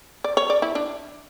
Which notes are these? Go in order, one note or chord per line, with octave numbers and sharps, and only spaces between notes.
D5
C#5
D5
E4
D4